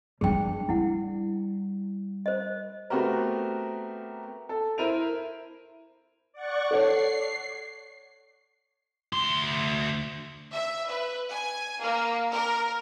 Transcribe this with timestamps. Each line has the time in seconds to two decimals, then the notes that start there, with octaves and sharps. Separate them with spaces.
0.21 G3 D4 G#4 G5
0.69 G3 E4 F#5
2.26 C5 D#5
2.90 A3 B3 C4 F#4 G4 A#4
4.49 A4
4.78 E4 A#4 C5 D#7 F7
6.32 D5 F#5 C#6
6.71 A4 C#5 C7
9.13 D2 C6
10.54 E5
10.89 B4
11.32 G#5
11.82 A#3
12.33 A#4